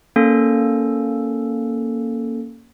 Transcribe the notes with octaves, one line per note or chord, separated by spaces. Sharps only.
A#3 C#4 A4